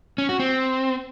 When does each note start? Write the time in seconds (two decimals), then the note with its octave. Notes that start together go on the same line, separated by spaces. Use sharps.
0.18 C#4
0.29 F#4
0.40 C4